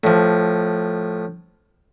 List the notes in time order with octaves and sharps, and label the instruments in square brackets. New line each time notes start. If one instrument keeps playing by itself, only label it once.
[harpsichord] A2 F3